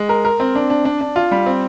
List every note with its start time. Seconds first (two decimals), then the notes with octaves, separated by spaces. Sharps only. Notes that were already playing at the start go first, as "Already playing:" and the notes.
Already playing: G#3
0.09 A#4
0.25 A#4
0.40 C4
0.55 D4
0.70 D4
0.85 D4
1.01 D4
1.16 F4
1.31 G3
1.46 C4